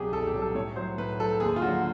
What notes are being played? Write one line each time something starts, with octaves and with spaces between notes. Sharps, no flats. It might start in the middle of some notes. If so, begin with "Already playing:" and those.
Already playing: C2 B2 F#3 G4 G#4
C2 A4
G4
B2 F#3
A4
A2 C#5
F#3 C5
A2 B4
F#3 A4
D#2 G#4
F4
D3 F#3 F#4